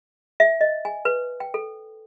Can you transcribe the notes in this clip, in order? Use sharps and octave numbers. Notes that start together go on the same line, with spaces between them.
E5
D#5
G#5
B4
G5
A4